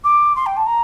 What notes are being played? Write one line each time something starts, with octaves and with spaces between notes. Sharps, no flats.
D6
C6
G5
A5
A#5